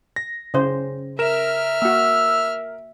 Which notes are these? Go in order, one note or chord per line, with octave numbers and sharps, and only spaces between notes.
A#6
C#3 C5
A#4 E5 F6 E7
A#3 F#4 E6